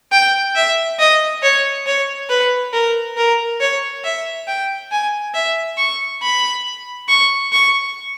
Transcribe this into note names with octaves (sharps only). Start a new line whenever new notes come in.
G5
E5
D#5
C#5
C#5
B4
A#4
A#4
C#5
E5
G5
G#5
E5
C#6
B5
C#6
C#6